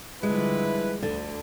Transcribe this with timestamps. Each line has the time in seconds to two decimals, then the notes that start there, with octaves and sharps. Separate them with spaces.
0.23 D3 F3 G3 G#3 E4 B4
1.02 D2 D3